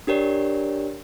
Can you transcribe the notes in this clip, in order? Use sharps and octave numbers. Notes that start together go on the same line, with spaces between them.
D4 G4 A#4 C#5 D5